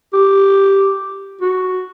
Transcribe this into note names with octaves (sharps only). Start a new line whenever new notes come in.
G4
F#4